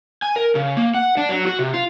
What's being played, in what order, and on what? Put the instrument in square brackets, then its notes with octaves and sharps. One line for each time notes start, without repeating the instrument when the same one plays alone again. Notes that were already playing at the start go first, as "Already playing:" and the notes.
[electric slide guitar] G#5
A#4
C#3
A#3
F#5
D4
F#3
F#4
C3
F4